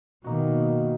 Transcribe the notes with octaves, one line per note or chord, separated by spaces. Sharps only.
B2 D#3 A#3 D#4 F#4